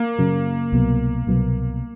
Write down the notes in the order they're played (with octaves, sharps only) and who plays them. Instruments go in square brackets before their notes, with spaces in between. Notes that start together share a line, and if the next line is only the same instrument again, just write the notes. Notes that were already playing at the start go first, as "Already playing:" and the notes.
Already playing: [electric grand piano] A#3
[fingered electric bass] F#2 C#3 F#3
C2 B2 F#3 B3
C2 B2 F#3 B3